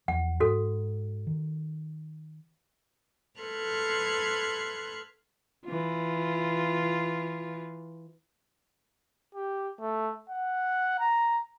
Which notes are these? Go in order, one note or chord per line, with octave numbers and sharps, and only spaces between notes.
E2 F3 F#5
G#2 F#4 A4
D#3
A4 B4 C6 F6 F#6 G#6
E3 F4
G4
A3
F#5
A#5